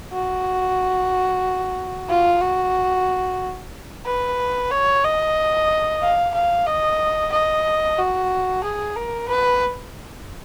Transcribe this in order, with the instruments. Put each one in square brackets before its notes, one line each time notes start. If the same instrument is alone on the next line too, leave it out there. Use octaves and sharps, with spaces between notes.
[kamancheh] F#4
F4
F#4
B4
C#5
D#5
F5
F5
D#5
D#5
F#4
G#4
A#4
B4